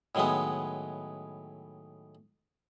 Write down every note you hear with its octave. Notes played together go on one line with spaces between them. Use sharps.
A2 D#3 F#3 G#3 B3